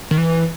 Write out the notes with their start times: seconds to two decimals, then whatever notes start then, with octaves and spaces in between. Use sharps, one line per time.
0.11 D#3
0.18 E3